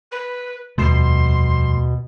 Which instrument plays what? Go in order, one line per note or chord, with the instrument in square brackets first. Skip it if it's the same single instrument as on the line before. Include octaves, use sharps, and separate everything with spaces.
[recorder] B4
[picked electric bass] D#1 [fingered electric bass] F2 G3 A3 [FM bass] B2 [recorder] C6